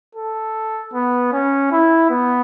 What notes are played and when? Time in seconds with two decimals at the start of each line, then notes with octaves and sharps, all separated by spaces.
0.15 A4
0.94 B3
1.33 C#4
1.72 E4
2.11 B3